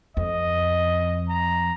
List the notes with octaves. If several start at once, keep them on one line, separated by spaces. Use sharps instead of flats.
F2 D#5
A#5